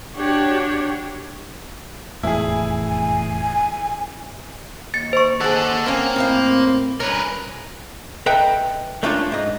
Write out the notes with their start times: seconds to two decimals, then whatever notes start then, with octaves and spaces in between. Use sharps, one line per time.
0.15 D4 F#4 G4 C#5
2.23 F1 E2 A2 E4 G#4 G#5
2.87 G#5
4.94 D#2 A6 C#7
5.13 C5 C#6
5.41 D#2 G#4 A4 F#5
5.86 A#3 C4 C#4
6.16 A2 C4 F5
7.00 G2 C#4 A#4 B4
8.26 A4 B4 D#5 E5 G5 A#5
9.03 A3 A#3 C#4 D4 F4 A4
9.32 G#2 D#5